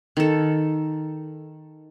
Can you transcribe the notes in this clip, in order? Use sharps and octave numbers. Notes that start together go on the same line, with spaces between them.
D#3 A4